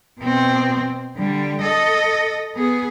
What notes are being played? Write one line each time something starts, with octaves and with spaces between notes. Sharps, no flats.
B2 C4
D3 G3
A4 D#5
B3 G#4